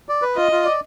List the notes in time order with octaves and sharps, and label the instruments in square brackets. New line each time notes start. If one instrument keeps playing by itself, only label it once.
[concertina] D5
B4
[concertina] F4 [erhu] D#5
[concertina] F4
D5